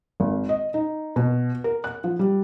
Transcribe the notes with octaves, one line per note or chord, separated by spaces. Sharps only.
G#1
D#5
D#4
B2
A#4
F#6
F3
G3